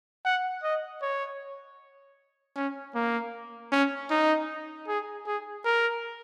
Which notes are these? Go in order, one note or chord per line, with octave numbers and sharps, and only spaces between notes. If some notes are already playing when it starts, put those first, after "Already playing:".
F#5
D#5
C#5
C#4
A#3
C#4
D#4
G#4
G#4
A#4